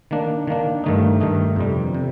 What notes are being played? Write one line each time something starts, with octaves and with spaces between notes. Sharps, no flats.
D#3 A#3 D4
D#3 A#3 D4
G2 D#3 A3 D#4
G2 D#3 A3 D#4
F2 C3 G3
C3